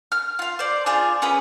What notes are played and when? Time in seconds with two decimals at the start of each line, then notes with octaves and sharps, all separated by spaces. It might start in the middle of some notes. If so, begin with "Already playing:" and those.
0.12 F6
0.39 F4 F5
0.59 C5 D5
0.86 D4 F4 G#4 C5
1.22 C#4 G#4 B4 B5